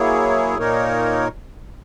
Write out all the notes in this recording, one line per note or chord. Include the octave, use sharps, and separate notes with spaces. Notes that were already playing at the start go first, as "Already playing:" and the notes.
Already playing: F#3 A#3 E4 G#4 C#5
A#2 A#3 D#4 A#4 C#5